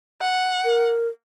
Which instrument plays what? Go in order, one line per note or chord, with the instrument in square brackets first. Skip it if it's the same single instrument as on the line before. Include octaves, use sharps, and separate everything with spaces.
[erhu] F#5
[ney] A#4